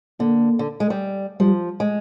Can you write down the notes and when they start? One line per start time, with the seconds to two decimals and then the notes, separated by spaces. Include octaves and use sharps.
0.20 D3 A#3
0.59 D3
0.80 G#3
0.90 G3
1.40 F3 G3
1.80 G#3